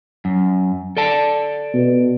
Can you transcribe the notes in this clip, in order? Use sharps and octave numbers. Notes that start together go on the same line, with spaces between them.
F#2
A4 D5 A5
B2